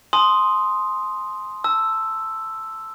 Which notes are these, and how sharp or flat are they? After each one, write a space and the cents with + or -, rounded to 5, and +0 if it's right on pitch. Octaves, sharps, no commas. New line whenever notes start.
G#5 +40 C6 +0 D#6 +0
A5 +10 E6 +0